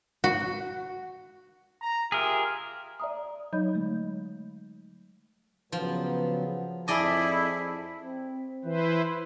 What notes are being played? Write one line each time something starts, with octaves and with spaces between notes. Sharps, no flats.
F#4
A#5
F4 G4 G#4 A#4 E5
D5 E5 A#5 D#6
F#3 D#4 C#5 D#5 B5 G6
D3 G#3 A3
C#3 F3 F#3 B3
F2 E4 G#4 D5 D#5 A5
C4
E3 E4 B4 C5